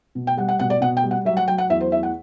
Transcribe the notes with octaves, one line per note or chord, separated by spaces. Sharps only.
B2
G5
G3 F#5
F#5
B2 F#5
D5
B2 F#5
G5
G3
F#5
F#3 E5
F#5
F#3 G5
F#5
E2 E5
C5
E2 E5
F#5